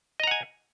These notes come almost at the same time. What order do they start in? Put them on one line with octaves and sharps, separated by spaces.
D#5 A#5 F#5 G#5